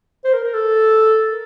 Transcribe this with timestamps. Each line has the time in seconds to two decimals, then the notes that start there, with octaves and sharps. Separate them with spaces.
0.24 C5
0.34 A#4
0.44 A#4
0.54 A4
1.29 A#4